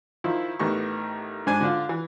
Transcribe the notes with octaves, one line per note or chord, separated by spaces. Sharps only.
D#3 F3 E4
A1 D#3 B3 G4 C#6
G#2 D4 C5 G#5
D3 D4 F4
E3